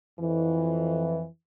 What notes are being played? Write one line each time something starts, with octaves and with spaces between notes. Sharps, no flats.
F2 E3